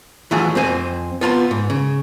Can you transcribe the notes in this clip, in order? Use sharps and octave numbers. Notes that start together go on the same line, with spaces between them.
E3 F#3 G3 A3 F4 G#4
F2 C4 C5 G#5
B3 F4 A#5 C6
G#2
C#3